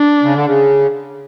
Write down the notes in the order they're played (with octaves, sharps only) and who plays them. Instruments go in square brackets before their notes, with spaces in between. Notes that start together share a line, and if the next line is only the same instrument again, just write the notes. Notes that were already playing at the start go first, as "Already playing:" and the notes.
Already playing: [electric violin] D4
[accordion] C#3
D3
C#3